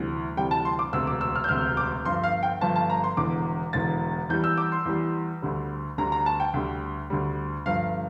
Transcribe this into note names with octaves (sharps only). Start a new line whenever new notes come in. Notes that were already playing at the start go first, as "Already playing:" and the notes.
Already playing: D2 C3 E3 G3
D2 C3 E3 G3 G5
A5
C6
D6
E1 D2 C3 E6
D6
E6
F6
G6
E1 D2 C3 F6
D6
G1 G2 F3 C6
F5
G5
G1 G2 F3 A5
A5
A#5
C6
E1 E2 D3 D6
E1 E2 D3 A6
E2 E3 G3 G6
E6
D6
C6
E2 E3 G3
D2 D3 G3
D2 D3 G3 A#5
A#5
A5
G5
D2 D3 G3
D2 D3 G3
G1 G2 F3 F5